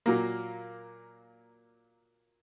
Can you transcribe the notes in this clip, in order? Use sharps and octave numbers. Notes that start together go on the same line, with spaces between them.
A#2 F#3 A#3